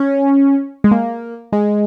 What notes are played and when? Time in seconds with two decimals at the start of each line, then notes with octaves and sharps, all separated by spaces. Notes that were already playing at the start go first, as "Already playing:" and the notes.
Already playing: C#4
0.84 G#3
0.91 A#3
1.53 G#3